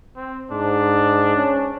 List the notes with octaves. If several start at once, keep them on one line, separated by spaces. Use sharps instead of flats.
C4
G#2 D4
C#4